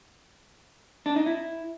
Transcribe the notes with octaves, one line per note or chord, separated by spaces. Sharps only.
D4
D#4
E4